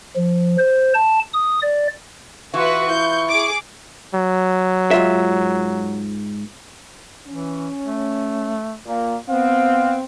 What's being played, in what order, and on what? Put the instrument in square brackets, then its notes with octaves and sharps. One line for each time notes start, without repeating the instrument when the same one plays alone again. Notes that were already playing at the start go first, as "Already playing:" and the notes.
[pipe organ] F3
C5
A5
D#6
D5
[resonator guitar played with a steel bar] E3 F4 [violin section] F#4 B4 [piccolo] C#6
[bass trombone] E4 [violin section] G6
[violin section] G#4 D6
[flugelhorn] F#3
[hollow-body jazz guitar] G#2 F4 E5
[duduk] E3 [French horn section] C#4
[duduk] A3
[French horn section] A#2 [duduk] A#3
[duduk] B3 [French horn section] C4 [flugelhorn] F5